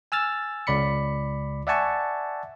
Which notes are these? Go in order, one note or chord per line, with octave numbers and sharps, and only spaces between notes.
G#5 E6 F6 A6
C#2 D5 B5 C#7
D5 E5 F#5 G#5 A5 C#6